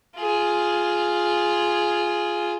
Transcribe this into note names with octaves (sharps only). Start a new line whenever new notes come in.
F4 G#4